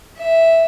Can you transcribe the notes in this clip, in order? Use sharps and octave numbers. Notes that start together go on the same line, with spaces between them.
E5